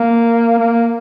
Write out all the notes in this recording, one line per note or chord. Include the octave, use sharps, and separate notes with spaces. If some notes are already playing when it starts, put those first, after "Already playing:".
Already playing: A#3
A#3